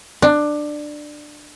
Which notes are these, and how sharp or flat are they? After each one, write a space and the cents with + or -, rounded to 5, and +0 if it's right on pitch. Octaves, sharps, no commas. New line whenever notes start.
D4 +15